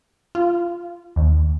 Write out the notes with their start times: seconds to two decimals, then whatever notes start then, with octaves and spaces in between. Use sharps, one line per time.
0.35 F4
1.16 D#2